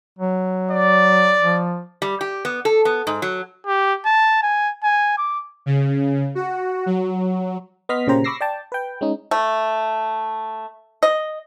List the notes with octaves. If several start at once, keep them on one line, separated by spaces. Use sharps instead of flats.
F#3
D5
F3
G3
G4
B3
A4
B3
G#2
F#3
G4
A5
G#5
G#5
D6
C#3
F#4
F#3
B3 D#5 C6 F6 B6
A#2 C#3 A#3 G4 C5 A#5
B5 C#6 D6 E6 A#6 C7
D5 G5 A5
B4 G5
G#3 C#4 D#4
A3
D#5